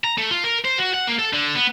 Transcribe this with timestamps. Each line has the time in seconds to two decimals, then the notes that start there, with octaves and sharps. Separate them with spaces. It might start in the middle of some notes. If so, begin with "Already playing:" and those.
0.04 A#5
0.18 A3
0.31 F4
0.44 A#4
0.65 C5
0.78 F#4
0.94 F#5
1.07 A#3
1.19 A4
1.33 D3
1.55 B3